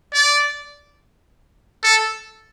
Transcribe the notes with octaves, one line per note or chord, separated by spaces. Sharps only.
D5
A4